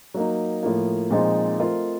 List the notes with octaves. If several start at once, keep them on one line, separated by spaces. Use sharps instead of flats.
F#3 A#3 D#4
A2 F3 A#3
A#2 F3 G#3 C4 D#4
A3 C4 F4 A#4 D#5